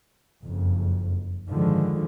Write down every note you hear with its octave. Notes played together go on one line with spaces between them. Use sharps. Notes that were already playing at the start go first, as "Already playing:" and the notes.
F#1 F2
G#2 D3 D#3 F3 G#3